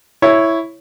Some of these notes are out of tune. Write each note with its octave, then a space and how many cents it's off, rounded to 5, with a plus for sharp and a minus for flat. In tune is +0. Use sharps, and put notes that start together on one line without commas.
E4 +0 C#5 +0